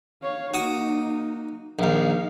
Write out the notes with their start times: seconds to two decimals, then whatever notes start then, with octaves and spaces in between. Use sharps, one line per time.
0.23 C#5 F5
0.54 A#3 D#4 F#4 D#6
1.79 A#1 D#2 D#4 F5